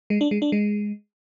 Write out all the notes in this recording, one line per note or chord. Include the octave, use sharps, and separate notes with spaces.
G#3
D4
G#3
D4
G#3